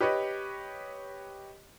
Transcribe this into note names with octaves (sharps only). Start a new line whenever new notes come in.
G4 B4 C#5 D#5